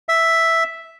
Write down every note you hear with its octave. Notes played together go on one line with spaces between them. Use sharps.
E5